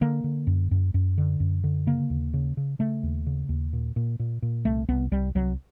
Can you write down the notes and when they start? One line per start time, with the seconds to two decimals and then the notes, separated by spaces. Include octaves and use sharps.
0.01 D3 A#3
0.24 D3
0.47 F#2
0.71 F#2
0.94 F#2
1.18 D3
1.40 F#2
1.64 D3
1.87 C#3 A#3
2.10 D#2
2.34 C#3
2.57 C#3
2.79 C#3 A3
3.03 D#2
3.27 C#3
3.49 D#2
3.73 A#2
3.96 A#2
4.20 A#2
4.42 A#2
4.65 C2 A3
4.88 C2 B3
5.11 C2 G3
5.35 C2 F#3